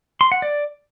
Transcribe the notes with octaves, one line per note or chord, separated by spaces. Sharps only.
C6
F#5
D5